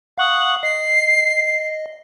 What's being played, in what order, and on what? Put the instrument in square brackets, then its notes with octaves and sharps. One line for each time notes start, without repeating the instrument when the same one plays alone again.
[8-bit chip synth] F5 C#6 D#6 [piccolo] F#5
[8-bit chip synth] D#5 [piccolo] C7